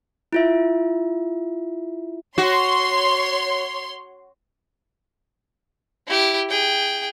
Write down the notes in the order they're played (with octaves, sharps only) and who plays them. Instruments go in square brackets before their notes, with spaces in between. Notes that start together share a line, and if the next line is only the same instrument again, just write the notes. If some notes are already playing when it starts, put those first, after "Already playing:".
[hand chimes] E4 F4 E5
[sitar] F#4 [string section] C#5 C6
[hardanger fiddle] E4 G4
G#4 G5